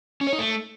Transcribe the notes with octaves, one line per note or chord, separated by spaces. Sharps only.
C#4
C#5
D#4
A3